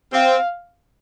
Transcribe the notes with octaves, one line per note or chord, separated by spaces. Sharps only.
C4 F5